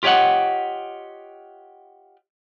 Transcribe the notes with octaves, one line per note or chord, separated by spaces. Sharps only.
F4 G4 C#5 D#5 F#5